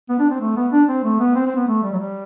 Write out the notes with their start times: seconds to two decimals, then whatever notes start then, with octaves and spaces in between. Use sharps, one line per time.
0.09 B3
0.20 D4
0.30 C4
0.41 A3
0.56 B3
0.72 D4
0.88 C4
1.04 A3
1.20 B3
1.35 C4
1.46 C4
1.56 B3
1.67 A3
1.83 G3
1.93 F#3
1.99 G3